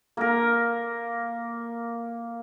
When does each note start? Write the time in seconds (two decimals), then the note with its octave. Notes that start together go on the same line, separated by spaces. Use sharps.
0.17 A#3 A#4